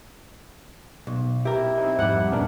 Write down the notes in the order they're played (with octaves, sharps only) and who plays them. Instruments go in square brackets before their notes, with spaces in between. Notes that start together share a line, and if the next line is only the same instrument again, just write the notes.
[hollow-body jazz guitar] B1
[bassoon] E4 [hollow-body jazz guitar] G4 A#4
[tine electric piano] C4 D#4
[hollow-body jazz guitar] F2 G3 [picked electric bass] G#2 [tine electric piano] F#5 F#6
[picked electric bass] D#1 A#2 C#4 [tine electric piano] B3 D4 A#4